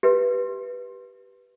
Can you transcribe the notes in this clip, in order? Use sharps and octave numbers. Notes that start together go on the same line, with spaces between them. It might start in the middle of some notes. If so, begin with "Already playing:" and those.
G4 B4 E5